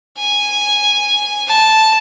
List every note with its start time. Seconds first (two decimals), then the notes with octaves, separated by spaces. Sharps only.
0.18 G#5
1.48 A5